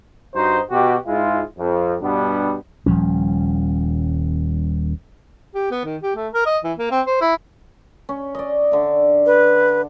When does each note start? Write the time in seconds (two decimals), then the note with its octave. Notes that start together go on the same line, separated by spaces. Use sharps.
0.34 G2 D#4 F#4 C5
0.70 B2 F#4 G4
1.06 G#2 G#3 E4 F4
1.58 F2
2.01 G2 B2 G3 B3 D4
2.86 D#1 F3 G3 C#4
5.55 G4
5.71 B3
5.84 D#3
6.02 G4
6.16 A3
6.33 A#4
6.46 D#5
6.64 E3
6.78 A#3
6.91 C4
7.06 C5
7.21 E4
8.09 C#4
8.35 D5 D#5
8.72 D3 E5
9.26 B4